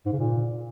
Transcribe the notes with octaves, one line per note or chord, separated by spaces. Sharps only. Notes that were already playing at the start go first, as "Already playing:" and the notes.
G#2
C#3
A#2